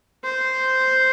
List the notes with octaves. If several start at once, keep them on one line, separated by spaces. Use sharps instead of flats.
C5